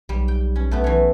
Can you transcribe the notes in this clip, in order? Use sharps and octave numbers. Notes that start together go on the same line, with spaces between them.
B1 G3
G5
C#4
B1 A3 B3 G4
E3 C#5